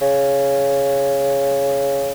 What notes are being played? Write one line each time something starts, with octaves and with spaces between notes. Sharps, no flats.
C#3